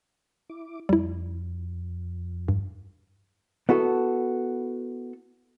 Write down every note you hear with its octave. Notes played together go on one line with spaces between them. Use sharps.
E4 D6
F2 G3 E4
G2
B3 E4 F#4 A4